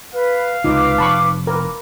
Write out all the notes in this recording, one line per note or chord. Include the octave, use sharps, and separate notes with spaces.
B4 F5
C#2 C3 D#4 F4 B4 D6
F1 A5 B5 C#6
A#4 B4 D6